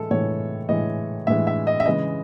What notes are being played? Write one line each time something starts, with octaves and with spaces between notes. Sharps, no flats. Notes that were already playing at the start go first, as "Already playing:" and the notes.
Already playing: A2 E3 G#3 A4
A2 E3 G#3 C#5
A2 E3 G#3 D#5
A2 E3 G#3 E5
E5
D#5
E5
C#3 E3 G#3 D#5